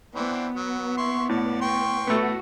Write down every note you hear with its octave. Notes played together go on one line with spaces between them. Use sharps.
E3 B3 C4 D4
F#3
E4 C6 C#6
A2 D5
G5 C6 C#6
A2 A3 B3 F#4